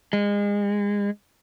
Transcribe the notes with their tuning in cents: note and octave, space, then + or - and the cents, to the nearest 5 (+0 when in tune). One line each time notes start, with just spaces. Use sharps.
G#3 -30